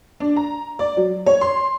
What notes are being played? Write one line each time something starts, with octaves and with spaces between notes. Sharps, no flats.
D4
A#5
D5
F#3
C#5
C6